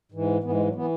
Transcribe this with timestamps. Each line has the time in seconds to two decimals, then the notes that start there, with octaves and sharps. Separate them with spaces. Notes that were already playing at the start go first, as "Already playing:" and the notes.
0.12 G#2 E3
0.43 G#2 E3 B3
0.54 G#3
0.65 F#3
0.75 E3 B3